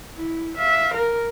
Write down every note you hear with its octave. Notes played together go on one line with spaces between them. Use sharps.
E4
E5 F5
A#4